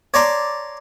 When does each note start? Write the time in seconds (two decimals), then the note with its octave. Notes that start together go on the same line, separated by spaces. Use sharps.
0.14 C#5 D5 A5 A#5 C6 D6